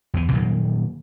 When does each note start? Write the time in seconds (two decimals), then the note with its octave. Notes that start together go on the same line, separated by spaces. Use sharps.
0.14 E2 E3
0.32 A#2 D#3 F#3 A#3